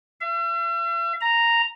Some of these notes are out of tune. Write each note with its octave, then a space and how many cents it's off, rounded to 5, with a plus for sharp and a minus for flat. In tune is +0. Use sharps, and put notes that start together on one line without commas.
E5 +45
A#5 -5